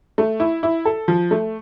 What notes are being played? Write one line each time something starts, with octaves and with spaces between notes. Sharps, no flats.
A3
E4
E4
A4
F3
A3